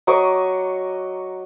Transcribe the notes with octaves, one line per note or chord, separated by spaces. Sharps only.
F#3 D#5 C#6 D6